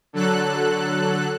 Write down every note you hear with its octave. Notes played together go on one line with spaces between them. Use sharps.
D3 F#3 A4 F#6